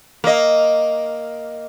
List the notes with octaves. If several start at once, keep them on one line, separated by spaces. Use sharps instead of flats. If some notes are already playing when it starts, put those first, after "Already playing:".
A#3 D#5